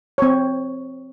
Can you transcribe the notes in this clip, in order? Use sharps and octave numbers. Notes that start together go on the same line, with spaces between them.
C4 C#5